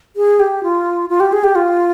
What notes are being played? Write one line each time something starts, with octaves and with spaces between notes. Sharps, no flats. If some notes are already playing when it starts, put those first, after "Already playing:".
G#4
G4
F4
F4
G4
G#4
G4
F4